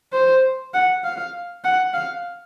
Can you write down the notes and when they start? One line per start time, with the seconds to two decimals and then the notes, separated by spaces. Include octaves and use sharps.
0.12 C5
0.74 F#5
1.04 F5
1.64 F#5
1.94 F5